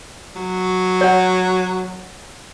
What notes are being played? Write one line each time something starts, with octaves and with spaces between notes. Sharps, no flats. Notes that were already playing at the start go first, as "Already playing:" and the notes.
F#3
C#5 F#5